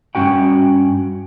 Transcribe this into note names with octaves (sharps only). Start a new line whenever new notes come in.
G2 C#4 F#4 G5